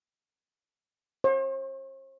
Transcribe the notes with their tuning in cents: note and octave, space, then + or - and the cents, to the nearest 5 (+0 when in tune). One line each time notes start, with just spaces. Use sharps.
C5 +45